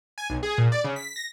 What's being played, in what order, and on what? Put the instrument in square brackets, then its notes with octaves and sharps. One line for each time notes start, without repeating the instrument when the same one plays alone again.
[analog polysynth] G#5
B1
G#4
A#2
D5
C#3
B6
A#6